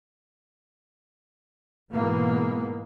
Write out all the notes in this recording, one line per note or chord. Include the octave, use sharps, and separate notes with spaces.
G#2 B2 E3 G#3 A#3 B3